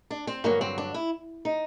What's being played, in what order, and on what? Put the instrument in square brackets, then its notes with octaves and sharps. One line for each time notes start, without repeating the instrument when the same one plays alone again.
[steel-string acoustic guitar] D4
C4
G2 D3 F#3 A#3
C4
D4
E4
D#4